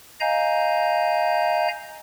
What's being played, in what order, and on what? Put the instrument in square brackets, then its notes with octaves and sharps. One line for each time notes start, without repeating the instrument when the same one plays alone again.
[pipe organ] D#5 F5 G#5 A#5 G6